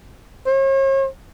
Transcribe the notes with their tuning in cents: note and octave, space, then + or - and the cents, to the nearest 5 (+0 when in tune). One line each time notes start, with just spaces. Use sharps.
C#5 -45